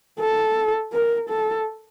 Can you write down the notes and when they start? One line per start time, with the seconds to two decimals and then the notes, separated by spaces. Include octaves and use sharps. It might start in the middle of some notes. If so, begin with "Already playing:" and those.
0.20 A4
0.93 A#4
1.29 A4